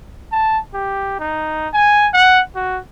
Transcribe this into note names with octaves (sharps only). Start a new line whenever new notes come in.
A5
G4
D#4
G#5
F#5
F#4